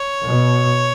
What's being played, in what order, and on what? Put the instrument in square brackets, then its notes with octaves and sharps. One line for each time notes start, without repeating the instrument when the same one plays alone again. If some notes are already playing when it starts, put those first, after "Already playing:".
Already playing: [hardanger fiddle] C#5
[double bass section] B2